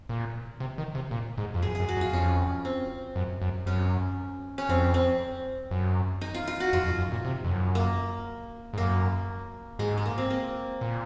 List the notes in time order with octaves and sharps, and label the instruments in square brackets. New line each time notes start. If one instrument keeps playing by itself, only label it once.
[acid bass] A#2
C3
D#3
C3
A#2
G#2
F2
[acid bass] F#2 [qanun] G#4
[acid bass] F#2 [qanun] G#4
[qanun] F#4
[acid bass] F#2
[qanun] F4
[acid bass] F2 [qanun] C#4
[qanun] C4
[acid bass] F#2
F#2
[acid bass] F#2 [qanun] C#4
[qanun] C#4
[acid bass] F2 [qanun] C4
[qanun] C4
[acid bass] F#2
[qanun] D#4
F4
F4
F#4
[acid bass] F2 [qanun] F4
[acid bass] F2
F#2
A#2
C3
F2
F#2
[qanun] A#3
[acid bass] G#2
[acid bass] F#2 [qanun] A#3
[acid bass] G#2 [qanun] G#3
[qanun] G#3
A#3
C4
A#3
[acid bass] A#2